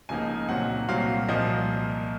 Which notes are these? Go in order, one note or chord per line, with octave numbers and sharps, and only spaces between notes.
C#2 C#3 F3 A#3 D#4 G#5
A#2 F#3 C4 F#5
C2 A#2 F#3 C4 F5
C2 A#2 F3 A#3 D#5